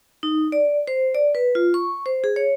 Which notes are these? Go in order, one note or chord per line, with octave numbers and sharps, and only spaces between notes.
D#4
D5
C5
D5
B4
F4
C#6
C5
G#4
C#5